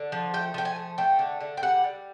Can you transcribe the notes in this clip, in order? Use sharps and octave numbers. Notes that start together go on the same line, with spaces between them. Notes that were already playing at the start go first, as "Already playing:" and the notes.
Already playing: D3
F3
A3 G5
F3 G5
G#5
A3
A3 G5
D3
D3
G5
G3 F#5
G3